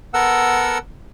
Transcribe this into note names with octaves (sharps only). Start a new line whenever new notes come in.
B3 A4 A#4 F#5 E6